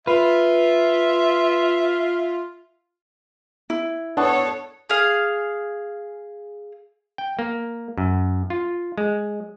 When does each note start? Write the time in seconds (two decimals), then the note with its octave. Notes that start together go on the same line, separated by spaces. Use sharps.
0.07 F4 B4 E5
3.70 E4
4.17 B3 D4 A4 C#5 A5 C#6
4.90 G#4 F5
7.18 G5
7.39 A#3
7.98 F#2
8.50 F4
8.98 G#3